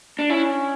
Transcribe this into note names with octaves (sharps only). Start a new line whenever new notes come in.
D4
C#4 E4